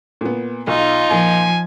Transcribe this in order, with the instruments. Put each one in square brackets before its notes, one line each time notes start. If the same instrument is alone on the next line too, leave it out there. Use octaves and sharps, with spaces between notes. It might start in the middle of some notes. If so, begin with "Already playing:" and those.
[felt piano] A#2 B3
[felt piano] B1 [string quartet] D#4 F4
[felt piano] A#2 [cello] F3 [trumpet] G#5